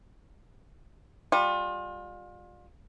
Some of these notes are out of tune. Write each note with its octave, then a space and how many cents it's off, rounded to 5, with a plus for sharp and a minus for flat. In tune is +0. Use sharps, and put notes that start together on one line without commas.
G3 +25 F4 +30